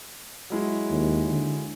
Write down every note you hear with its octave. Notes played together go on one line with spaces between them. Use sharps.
F#3 G#3 E4
D#2
D3